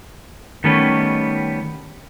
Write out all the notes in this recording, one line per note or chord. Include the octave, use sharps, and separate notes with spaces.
D#3 G3 A3 B3 C#4